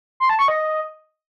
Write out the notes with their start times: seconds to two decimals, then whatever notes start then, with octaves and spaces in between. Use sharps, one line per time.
0.20 C6
0.29 A5
0.39 C#6
0.48 D#5